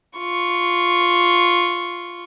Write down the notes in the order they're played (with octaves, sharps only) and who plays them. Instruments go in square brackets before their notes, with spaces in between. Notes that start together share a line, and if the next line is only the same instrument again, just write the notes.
[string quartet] F4 C#6